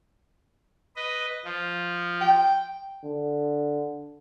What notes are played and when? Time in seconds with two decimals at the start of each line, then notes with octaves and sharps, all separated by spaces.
0.96 B4 D#5
1.45 F3
2.21 G5
3.04 D3